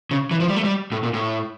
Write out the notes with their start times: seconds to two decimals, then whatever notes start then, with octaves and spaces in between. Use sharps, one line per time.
0.11 C#3
0.31 E3
0.40 F3
0.48 G3
0.56 A3
0.64 G3
0.92 A2
1.03 A#2
1.14 A2